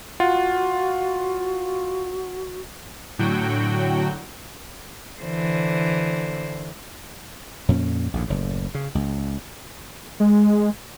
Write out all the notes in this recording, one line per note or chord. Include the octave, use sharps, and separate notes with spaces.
F4 F#4 F#5
A2 D3 F#3 F#4 G5
D3 E3 C5
F2 A#2 C#4
A#1 D#2 A2
F#1 A2
C#3
C#2
G#3